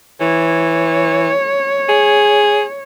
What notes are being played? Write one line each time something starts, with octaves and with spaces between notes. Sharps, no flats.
E3 C#5
G#4